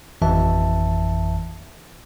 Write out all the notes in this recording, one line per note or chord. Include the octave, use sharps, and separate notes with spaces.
G#1 F2 E3 E5 A5